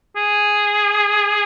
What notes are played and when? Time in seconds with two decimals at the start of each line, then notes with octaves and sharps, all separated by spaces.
0.16 G#4